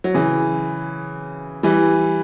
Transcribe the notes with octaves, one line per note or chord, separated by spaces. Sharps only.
F#3
C#3 E3
E3 G3